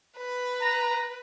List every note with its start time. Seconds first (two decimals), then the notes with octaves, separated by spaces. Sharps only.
0.18 B4
0.61 A#5